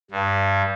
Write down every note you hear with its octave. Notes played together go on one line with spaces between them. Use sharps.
G2